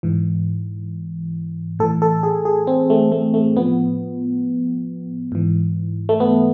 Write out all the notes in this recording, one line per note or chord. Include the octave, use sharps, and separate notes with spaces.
G#2 E3
A2 E3 A4
A4
G#4
G#4
C4
A3
A3
A3
A2 F3 B3
G#2 E3
A3
B3